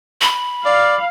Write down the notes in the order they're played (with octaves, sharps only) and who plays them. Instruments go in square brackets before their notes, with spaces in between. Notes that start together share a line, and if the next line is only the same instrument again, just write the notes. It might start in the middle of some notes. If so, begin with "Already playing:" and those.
[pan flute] B5
[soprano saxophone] D5 [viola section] F5